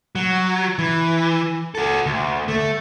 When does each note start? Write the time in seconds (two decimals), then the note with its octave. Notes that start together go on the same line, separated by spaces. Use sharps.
0.15 F#3
0.79 E3
1.75 F#4 A4
2.06 D2
2.48 A3